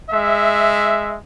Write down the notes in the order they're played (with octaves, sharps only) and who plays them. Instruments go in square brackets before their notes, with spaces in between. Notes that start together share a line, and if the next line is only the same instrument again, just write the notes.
[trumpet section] G#3 E5